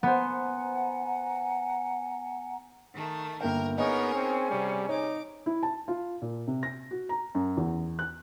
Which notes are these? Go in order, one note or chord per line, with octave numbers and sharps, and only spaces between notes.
B3 C5 F#5 G#5 A#5
D#3 A3
G1 A#3 A#4 G5
B3 C#4 D#4 G#4 A#4 C#5 D#5 G#5
C4
C3 G3
D#4 C#5 D6
E4
A5
F4
A#2
C3
A#6
F#4
A#5
F#2
E2
F#6